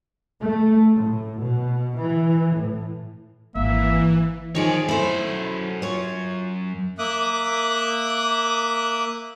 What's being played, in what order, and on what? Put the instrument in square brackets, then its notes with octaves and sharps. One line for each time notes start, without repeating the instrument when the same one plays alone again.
[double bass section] A3
A2
B2
E3
A2
[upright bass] G#1 [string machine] E3 [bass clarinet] A#3 [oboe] E5
[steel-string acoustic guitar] D#3 F3 G#4 [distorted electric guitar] C#5 D5
[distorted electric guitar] F#2 B5 [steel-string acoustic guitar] A3 E4 C5
[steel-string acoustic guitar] F4 C#5
[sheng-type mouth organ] A#3 E5 D6 D#6 F#6